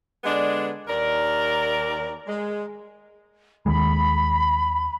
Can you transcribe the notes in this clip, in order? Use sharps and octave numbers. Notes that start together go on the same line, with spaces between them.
D3 G#3 B3 D4 D5 D#5
D#2 A#4 D5
G#3
D#2 D#3 G#3 B5